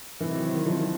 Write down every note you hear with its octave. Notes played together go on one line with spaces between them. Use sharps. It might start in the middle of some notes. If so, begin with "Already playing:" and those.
C3 D#3 E3 F#3
F3